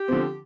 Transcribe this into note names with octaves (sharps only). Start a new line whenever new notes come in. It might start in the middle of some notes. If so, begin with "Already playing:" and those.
Already playing: G4
D3 F3 C4